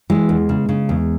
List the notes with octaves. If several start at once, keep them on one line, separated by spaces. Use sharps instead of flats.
E3 G#3
E2
C#3
C#3
E2